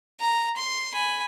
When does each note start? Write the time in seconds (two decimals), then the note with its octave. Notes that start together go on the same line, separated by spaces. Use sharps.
0.20 A#5
0.56 C6
0.94 G#5 B5